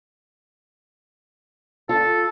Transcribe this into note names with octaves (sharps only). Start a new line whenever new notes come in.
F4 A4